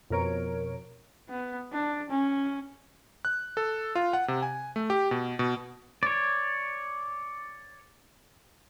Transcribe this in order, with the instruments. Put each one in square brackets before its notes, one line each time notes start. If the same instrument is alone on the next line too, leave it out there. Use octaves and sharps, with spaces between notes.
[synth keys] F2 B2 A#4 C#5 D7
[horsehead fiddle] B3
D4
C#4
[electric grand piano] F#6
A4
F4
F#5
C3
G#5
A3
G4
B2
B2
[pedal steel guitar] C#5 D5